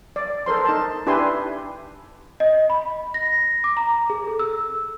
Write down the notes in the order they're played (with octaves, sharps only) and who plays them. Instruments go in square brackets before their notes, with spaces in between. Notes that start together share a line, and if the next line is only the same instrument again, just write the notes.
[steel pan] D5
A4 A#4 C5 C6
D#4 A5
D4 E4 G4 B4 G#5 C6
[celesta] D#5
B5
A#6
D6
A#5
G#4
A4
E6